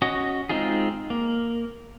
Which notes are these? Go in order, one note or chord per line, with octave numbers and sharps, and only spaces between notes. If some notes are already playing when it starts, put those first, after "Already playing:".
C#4 F#4 D#5
G#3 C4 D#4 F4 G#4
A#3